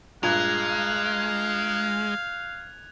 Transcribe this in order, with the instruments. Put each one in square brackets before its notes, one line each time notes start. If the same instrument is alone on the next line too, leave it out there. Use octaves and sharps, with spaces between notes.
[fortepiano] G2 A#2 [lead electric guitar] G#3 [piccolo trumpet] F5 [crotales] F#6 G#6 F7